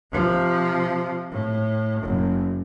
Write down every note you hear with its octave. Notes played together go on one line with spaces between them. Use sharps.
C3 F3
A2
F#1